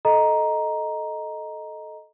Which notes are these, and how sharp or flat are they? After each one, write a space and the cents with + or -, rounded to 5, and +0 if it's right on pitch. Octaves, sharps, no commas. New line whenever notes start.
A4 -15 D#5 +0 A#5 +10